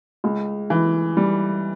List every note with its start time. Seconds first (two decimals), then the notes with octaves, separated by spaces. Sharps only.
0.24 C#2
0.70 E3
1.17 G3